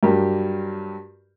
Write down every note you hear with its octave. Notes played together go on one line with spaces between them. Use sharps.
G2 F#3 G4 A#4